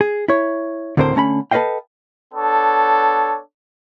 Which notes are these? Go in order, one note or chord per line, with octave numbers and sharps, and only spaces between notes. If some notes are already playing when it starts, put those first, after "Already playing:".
G#4
E4 C#5
D2 A2 D3 C4 A#4 C5
D3 A3 C#4 A#5 B5
A4 B4 D5 D#5 F5 G5
B3 D4 A4 C#5